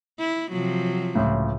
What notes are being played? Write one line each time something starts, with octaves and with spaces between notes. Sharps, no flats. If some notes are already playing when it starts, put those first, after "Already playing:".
E4
C3 F3 F#3
C#2 A2